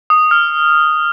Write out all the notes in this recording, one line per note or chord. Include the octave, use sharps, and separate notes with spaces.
D#6
F6